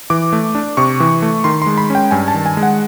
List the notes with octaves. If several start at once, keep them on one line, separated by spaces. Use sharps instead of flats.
E3 D6
A3
D4
C3 C#6
E3
A3
D#3 C6
G#3 C6
B5
C#4 G5
G2 G#5
A5
D#3
G#5
G#3
F#5